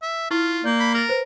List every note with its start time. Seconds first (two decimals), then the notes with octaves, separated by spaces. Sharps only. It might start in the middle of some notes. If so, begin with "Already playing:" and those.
0.02 E5
0.31 E4 F4 C#6 F6
0.64 A#3 D5 G6
0.80 B5
0.95 A#4 F6 A6
1.09 B4 C5